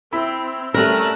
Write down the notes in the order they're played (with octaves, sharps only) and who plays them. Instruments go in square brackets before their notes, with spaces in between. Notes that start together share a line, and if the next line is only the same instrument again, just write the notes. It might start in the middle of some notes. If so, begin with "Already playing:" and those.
[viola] C4 [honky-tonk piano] E4
[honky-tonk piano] G3 [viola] A3 C#4 [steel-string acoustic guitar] A#4 [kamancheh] A5 F#6